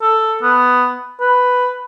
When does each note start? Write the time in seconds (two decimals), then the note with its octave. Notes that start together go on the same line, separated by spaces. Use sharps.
0.02 A4
0.42 B3
1.20 B4